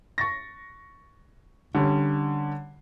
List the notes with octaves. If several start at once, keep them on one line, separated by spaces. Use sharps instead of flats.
C#6 A6 A#6
D3 G3 C#4